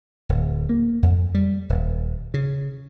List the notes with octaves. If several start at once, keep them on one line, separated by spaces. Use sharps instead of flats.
D1
A#3
F2
G3
D#1
C#3